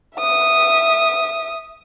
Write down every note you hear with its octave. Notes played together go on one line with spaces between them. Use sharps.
E5 D#6